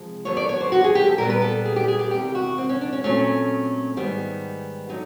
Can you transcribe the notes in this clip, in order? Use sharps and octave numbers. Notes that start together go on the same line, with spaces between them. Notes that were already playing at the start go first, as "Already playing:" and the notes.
Already playing: C3 F3 G#3
D#2 D3 F#3 B3 C#5
D5
C#5
C5
F#4
G#4
G4
A4
A#2 G3 B3 A#4
B4
A4
G#4
G4
G#4
G4
E2 C3 D#3 G4
F#4
C4
C#4
D4
C#4
A#2 F#3 A3 C4 C#4
G#2 D#3 G3 B3
D3 F#3 D#4